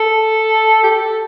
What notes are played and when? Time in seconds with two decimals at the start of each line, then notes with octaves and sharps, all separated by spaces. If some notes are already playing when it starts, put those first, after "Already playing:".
Already playing: A4
0.83 G4
0.90 A4